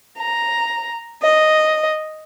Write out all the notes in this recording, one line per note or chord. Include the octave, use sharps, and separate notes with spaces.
A#5
D#5